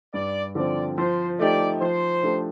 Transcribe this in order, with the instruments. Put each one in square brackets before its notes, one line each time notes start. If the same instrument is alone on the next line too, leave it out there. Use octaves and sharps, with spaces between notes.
[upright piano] G2 [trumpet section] D5
[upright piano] D3 F3 C4 [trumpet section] D5
[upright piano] F3 [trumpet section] C5
[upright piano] A3 D#4 G4 [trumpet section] D5
[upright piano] F3 [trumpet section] C5
[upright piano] A3 D4 G4